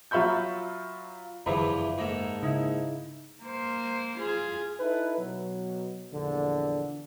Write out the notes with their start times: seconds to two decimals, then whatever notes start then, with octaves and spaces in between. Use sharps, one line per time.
0.11 F#3 F4 E5 B5 C#6 G6
1.46 F#1 E2 G2 D#3 F3 E5 B5
1.98 G#2 A#3 A4
2.42 C#3 D#4 E4
3.43 A#3 C5
4.19 F4 G#4
4.80 D#4 E4 A4 B4
5.18 B2 F#3
6.12 A#1 E2 D3